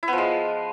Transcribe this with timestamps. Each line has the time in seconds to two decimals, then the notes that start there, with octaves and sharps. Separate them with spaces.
0.03 E4
0.08 B3
0.13 F3
0.18 G#3